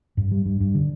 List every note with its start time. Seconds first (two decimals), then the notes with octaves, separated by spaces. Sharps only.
0.17 G2
0.32 G3
0.46 G2
0.60 G2
0.75 D3